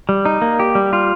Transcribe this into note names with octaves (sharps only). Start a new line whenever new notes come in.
G3
D#4
A#3
G4
G3
F4